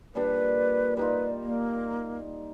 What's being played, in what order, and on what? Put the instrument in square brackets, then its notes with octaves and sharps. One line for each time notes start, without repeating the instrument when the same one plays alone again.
[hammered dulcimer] A#2 G3 D4 [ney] B4
[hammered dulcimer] G3 D#4 F4 [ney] B4
[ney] A#3